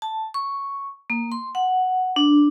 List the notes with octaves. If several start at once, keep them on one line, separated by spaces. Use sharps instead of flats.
A5
C#6
A#3
C6
F#5
D4